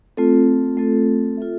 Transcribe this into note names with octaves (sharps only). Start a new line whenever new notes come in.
A3 C4 F4 A4
A3 C4 F4 A4
F4 A4 E5